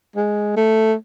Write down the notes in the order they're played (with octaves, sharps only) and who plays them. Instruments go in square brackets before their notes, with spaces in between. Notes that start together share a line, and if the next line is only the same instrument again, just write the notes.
[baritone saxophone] G#3
A3